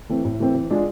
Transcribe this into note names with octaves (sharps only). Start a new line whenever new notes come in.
E3 A3 C4
A2
E3 A3 C4
E3
G#3 D4 F4 G#4